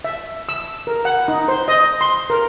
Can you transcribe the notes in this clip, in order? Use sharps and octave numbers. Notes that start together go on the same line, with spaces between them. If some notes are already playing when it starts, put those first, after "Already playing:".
E5
E6
A#4
F#5
D#4
C5
D#5
C6
A#4